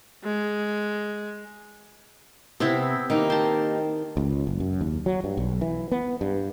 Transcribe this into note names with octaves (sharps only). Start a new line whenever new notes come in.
G#3
C3 B3 C4 E4
D#3 A#3 D#4 G4
C5 A5
C#2
F#1
F#2
D#2
F#3
G2
B1
E3
B3
G2